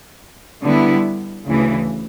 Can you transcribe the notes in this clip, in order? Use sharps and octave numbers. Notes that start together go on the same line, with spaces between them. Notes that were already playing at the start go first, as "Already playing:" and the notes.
D3 G3 B3 E4
D2 C#3 E3